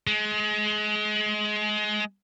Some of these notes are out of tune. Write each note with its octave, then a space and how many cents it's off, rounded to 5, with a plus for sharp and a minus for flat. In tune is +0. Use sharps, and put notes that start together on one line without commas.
G#3 +25